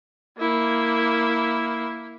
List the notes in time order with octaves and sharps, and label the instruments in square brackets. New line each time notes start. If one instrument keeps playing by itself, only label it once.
[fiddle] A#3 E4